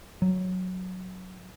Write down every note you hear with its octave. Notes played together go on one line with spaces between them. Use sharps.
F#3